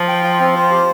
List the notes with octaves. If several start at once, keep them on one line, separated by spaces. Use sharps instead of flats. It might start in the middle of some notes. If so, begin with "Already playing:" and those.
Already playing: F3
G5
F4
C4
C5
G4